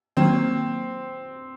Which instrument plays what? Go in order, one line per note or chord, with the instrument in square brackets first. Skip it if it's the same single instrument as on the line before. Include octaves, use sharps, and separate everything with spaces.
[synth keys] D#3 F#3 A#3 [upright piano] C4